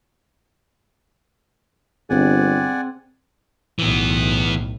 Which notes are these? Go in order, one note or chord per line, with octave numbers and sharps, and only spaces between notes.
G1 C4 G#4 D5 F#5 G#5
B1 A2 E3 B3